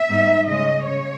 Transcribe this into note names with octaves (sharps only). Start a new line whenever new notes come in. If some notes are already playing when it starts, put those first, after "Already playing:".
Already playing: E5
G#2 G3 B3 D#4
C#3 G#3 C#4 D#5
C#3 C#5